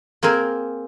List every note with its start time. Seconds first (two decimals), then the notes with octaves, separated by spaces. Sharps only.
0.23 A#3 C4 G#4 A#4